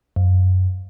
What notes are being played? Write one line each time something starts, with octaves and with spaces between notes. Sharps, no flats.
F#2